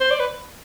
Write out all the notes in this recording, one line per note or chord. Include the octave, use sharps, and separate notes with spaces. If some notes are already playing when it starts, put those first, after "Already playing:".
C5
D5
B4